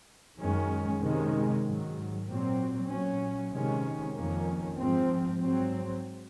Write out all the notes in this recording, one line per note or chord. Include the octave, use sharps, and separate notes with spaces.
F#2 D#3 G#3 C#4
C3 D#3 G#3 C#4
G#2 D#3 F#3
A#2 F#3 C4
A#2 F#3 C#4
C3 D#3 G#3 C#4
F2 D#3 A#3 C#4
G#2 F3 C4
G#2 F#3 C4